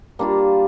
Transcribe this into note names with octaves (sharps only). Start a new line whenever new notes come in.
G3 A#3 D4 F4